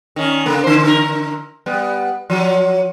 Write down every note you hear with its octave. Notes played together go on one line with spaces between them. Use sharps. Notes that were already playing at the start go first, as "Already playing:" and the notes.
D#3 C#4
C#3 A#3
D3 C5
D3 A#4
G3 B3
F3 F#3